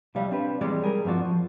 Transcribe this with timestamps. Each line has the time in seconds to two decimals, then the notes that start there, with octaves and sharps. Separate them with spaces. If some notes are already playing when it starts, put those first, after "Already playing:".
0.15 C2 F#3 G3 F5
0.31 C4 D4 G4 B4
0.61 E3 G3 G#3 C4 C#5 D5
0.82 G3 G#4 A#4
1.05 G2 F3 C4 F4 F#4 D5
1.25 F3